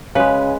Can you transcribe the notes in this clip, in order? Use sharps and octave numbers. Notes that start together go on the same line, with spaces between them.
C#3 G#3 B4